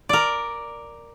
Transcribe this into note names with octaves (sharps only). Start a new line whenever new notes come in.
A#4 D5